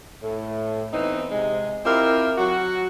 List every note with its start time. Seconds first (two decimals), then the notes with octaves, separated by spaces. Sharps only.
0.23 A2
0.92 E3 B3 C4 D#4
1.31 C3 G#3
1.85 C4 E4 F4 G4 A#4
2.38 F#3 F#4